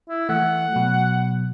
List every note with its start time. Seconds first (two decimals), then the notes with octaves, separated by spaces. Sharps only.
0.09 E4
0.29 E3 A3 F#5
0.72 B2 F#3